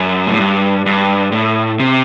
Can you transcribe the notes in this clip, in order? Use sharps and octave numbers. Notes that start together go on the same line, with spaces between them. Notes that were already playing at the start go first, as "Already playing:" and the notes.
Already playing: F#2
A2
G2
G2
A2
C3